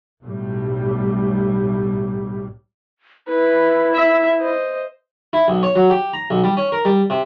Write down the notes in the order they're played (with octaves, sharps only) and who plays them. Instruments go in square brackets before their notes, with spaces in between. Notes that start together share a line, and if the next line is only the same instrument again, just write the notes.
[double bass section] B1 A2 G3
[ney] E4 [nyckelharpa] B4
[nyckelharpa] E5
C5 D#5
[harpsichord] E4
B1
C#5
F#3
G4
A#5
B1
G3
C#4
A#4
G3
C3